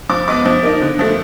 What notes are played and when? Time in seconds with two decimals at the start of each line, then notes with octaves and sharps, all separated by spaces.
0.09 F3 D6
0.28 G#3 B3 D6
0.45 F3
0.63 A#3 D#4
0.81 D3
0.99 F3 A3